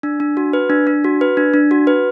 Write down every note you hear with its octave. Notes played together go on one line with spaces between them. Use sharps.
D4
D4
F#4
B4
D4
D4
F#4
B4
D4
D4
F#4
B4